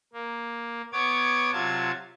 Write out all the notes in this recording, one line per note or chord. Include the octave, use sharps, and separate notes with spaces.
A#3
B3 C#5 D6 G#6
C3 F#3 F4 A5 G#6